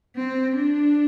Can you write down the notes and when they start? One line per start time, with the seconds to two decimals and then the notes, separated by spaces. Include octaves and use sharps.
0.16 C4
0.56 D4